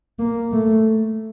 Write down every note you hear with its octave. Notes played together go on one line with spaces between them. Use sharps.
A#3
A3